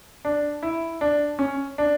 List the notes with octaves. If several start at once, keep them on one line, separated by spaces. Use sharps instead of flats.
D4
E4
D4
C#4
D4